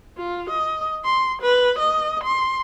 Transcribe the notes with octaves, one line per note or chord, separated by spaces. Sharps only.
F4
D#5
C6
B4
D#5
C6